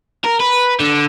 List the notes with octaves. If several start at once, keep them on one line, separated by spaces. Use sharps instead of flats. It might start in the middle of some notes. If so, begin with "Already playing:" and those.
A#4
B4
D3